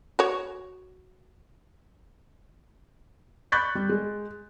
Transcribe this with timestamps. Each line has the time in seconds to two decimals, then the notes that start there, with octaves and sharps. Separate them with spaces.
0.19 F#4 C#5
3.52 B5 C#6 F#6 G6 A6 B6
3.75 G3
3.89 G#3